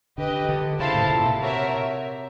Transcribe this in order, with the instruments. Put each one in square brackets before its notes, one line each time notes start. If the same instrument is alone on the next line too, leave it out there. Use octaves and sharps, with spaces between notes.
[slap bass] D3 [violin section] G4 B4 D#5
[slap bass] D3
[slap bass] C#3 [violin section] E4 A4 C5 F5 A5
[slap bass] A2
A#2
C3
[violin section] F#4 A#4 C#5 E5